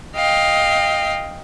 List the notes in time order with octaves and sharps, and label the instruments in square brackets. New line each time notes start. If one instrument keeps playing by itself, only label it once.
[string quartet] D#5 F5 G5